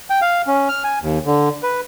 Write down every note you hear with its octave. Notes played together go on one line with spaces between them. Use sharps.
G5
F5
C#4
F6
G#5
D#2
D3
B4